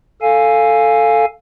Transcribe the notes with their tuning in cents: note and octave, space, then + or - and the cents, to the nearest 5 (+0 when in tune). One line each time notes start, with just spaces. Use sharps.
A4 +5 F5 +0 G#5 +0